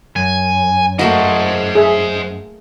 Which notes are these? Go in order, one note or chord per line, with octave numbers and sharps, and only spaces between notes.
F#2 G#5
A3 A#3 F#4 C5 D#5
G#4 E5